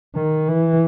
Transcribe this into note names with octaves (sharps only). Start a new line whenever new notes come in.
D#3
E3